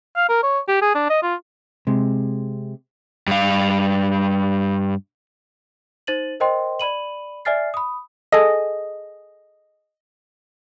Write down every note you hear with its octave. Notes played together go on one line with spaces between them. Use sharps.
F5
A#4
C#5
G4
G#4
D4
D#5
F4
C3 G#3
G2 F5
D#4 C5 A6 D#7 F#7
A#4 C5 D#5 G5 C6
D5 B5 D#7 F#7
D5 E5 G#5 F6 A6 C7
B5 D#6
G#4 A4 D#5